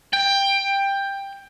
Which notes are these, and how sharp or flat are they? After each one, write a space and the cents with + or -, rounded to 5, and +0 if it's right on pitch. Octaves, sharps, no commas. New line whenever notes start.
G5 +15